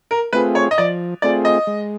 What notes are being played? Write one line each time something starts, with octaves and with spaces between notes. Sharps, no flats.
A#4
A3 C4 F4 G#4 B4
C#5
D#5
F3 D5
A3 C4 F4 G#4 D5
D#5
G#3